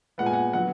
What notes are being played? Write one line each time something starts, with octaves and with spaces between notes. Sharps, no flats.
A#2 G#3 B3 F#5
G#5
F#5
D3 F#3 B3 F#5